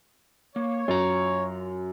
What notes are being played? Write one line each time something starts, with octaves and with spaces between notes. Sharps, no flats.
A#3 C#5
F#2 F4 A#5